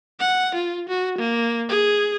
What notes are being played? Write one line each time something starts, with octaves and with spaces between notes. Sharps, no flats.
F#5
F4
F#4
A#3
G#4